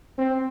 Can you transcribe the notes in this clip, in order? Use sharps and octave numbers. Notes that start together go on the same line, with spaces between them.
C4